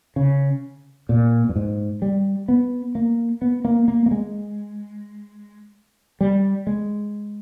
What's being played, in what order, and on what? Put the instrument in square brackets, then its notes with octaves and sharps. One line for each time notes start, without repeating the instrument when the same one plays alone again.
[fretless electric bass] C#3
A#2
G2
G#2
G3
B3
A#3
B3
A#3
A#3
A#3
G#3
G3
G#3